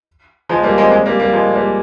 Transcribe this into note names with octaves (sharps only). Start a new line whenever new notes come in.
F3 G#3
G3 A#3
G#3 C4
G#3 C4
G3 A#3
G3 A#3
F3 G#3
G3 A#3